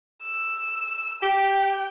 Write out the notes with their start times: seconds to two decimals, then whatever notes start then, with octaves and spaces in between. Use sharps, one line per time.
0.23 E6
1.23 G4 G5